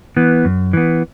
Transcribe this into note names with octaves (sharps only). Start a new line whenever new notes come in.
E3 B3
F#2
E3 B3